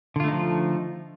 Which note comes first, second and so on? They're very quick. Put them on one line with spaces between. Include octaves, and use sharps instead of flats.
D3 F4 A3 D#4 F3